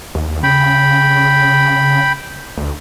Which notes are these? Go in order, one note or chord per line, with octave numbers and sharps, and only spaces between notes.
D#2
C#3 G5 B5
D2